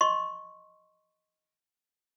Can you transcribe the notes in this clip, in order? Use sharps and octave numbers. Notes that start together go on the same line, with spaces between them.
D#5 C6 C#6